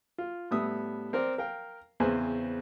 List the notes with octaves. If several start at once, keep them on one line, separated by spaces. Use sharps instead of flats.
F4
A2 G3 B3 E5 D#6
C4 A#4 C5 D5
A#4 F5 G5
E2 C#3 C4 B4 C5 G#5